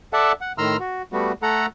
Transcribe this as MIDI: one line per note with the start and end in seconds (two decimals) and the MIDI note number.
0.13 0.32 69
0.13 0.32 74
0.13 0.32 76
0.13 0.32 78
0.13 0.32 81
0.41 0.52 78
0.58 0.77 45
0.58 0.77 51
0.58 0.77 82
0.58 0.77 84
0.58 0.77 88
0.58 0.77 89
0.80 1.02 66
1.13 1.32 55
1.13 1.32 57
1.13 1.32 59
1.13 1.32 66
1.43 1.66 57
1.43 1.66 69
1.43 1.66 78
1.43 1.66 82